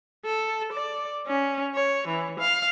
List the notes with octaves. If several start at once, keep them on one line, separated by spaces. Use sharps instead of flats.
A4
D5
C#4
C#5
E3
F5